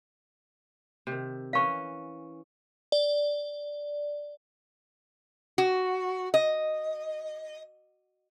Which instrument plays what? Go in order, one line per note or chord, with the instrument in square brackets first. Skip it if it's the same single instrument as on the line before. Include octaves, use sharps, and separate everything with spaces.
[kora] C3 D#3
[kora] E3 C#4 A#4 [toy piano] F5 C#6
[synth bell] D5
[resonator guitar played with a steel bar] F#4
D#5